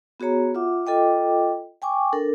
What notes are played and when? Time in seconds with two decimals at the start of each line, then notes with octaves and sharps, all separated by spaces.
0.20 B3 F#4 G#4 C#5 A#5
0.55 F4 E5 F#5 D6
0.86 F4 A4 D#5 G5 D6
1.82 G5 G#5 C#6 D6
2.13 D4 A4 A#4